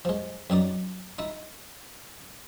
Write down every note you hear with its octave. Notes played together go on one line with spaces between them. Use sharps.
F3 G#3
F#2 F#3 D#4 D5
D#4 E4